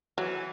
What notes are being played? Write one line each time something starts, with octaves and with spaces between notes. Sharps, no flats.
E3 F#3